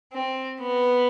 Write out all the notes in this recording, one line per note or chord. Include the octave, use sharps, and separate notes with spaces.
C4
B3